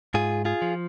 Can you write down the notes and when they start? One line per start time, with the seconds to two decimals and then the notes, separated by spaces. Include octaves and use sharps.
0.14 G#2 F4 G#4
0.45 F4 G#4
0.62 F3